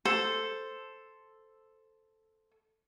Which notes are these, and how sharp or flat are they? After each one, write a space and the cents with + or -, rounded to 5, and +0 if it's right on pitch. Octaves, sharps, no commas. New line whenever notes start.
A4 +0 C5 +0